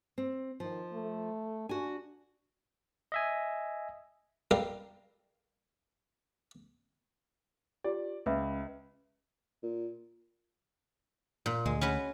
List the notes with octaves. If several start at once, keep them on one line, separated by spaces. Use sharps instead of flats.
C4
D#3 F3
A3
D4 F#4 G#5
D#5 E5 G#5
G3 A4 A#4 F5
F4 G4 D5
C#2 B4 E5
A#2
A#2
D2 G#3
C#4 F#4 B4